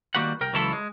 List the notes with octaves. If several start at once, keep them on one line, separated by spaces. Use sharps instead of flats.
D#3 G3 A#3 F#4 B4 F#5
C2 A#4 G5
C#2 E3 F#3 E4 F4 A4
G#3